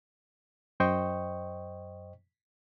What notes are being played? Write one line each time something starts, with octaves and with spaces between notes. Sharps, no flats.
F#2 C5 D#5 G5 C#6